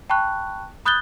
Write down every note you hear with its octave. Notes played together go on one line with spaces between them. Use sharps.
G5 A5 B5 C#6 F#6
B5 D#6 F#6 G6 A6 G7